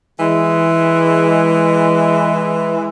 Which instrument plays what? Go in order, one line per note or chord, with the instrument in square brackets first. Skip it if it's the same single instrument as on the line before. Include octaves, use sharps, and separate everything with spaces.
[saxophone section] E3 G#3